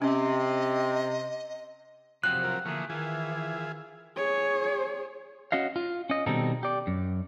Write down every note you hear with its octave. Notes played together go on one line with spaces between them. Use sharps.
C3 C#4 D#5
C3 F3 F#3 C4 F#6
F4 A#4
D3 E3 F3 A3 A#3 G#4
D#3 E3 E4 F4 G#4
D#3
G#4 C#5
C#4 F#4 D#5 F5
F4
C#4 D#5
B2 D#3 G3 C4 D#4 A4
G4 D5
F#2